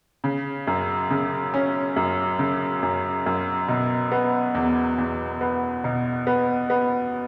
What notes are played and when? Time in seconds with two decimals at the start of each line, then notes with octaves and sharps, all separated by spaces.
0.24 C#3
0.67 F#2
1.10 C#3
1.54 C#4
1.96 F#2
2.39 C#3
2.83 F#2
3.26 F#2
3.68 B2
4.12 B3
4.55 E2
4.98 E2
5.41 B3
5.84 B2
6.27 B3
6.70 B3